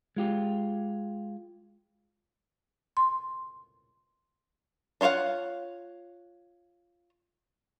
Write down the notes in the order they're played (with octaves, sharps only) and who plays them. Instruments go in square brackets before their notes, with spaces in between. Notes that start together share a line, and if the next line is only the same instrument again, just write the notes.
[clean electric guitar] G#3 F4 G4
[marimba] C6
[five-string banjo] D4 F4 C#5 F5 F#5